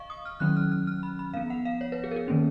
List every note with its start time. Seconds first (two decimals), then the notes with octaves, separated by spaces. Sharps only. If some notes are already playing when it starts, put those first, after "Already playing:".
Already playing: D#5 F5 C#6
0.10 D#6
0.25 F6
0.40 D#3 F#3 C#4 F#6
0.56 F6
0.72 F6
0.87 F6
1.03 B5
1.19 B5
1.33 F3 B3 F5
1.50 F#5
1.65 F5
1.81 C#5
1.92 B4
2.04 G#4
2.11 A#4
2.16 G#4
2.28 D#3 A#3 C#4